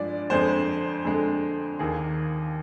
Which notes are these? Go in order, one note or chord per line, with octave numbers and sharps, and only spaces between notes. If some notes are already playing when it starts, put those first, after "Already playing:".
Already playing: G2 F3 G#3 D5
F2 D3 G#3 C5
F2 D3 G#3
D#2 D#3 A#3 G#4